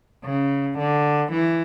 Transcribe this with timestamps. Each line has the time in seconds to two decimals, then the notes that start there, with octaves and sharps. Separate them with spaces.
0.24 C#3
0.78 D3
1.32 E3